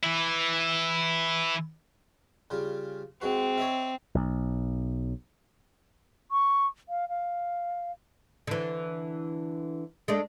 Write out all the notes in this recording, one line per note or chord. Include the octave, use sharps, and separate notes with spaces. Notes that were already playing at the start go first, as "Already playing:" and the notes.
E3 E4
C#3 G3 F4
G#3 C4 F#4
C#5 D#5 E5
B1
C#6
F5
F5
D3 E3
G#3 A3 D4